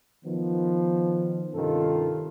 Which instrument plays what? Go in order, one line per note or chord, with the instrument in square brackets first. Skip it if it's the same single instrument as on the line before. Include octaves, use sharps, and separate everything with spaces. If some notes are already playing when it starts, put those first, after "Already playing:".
[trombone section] D#3 F3 B3
G2 C3 D#3 C#4 F4 A4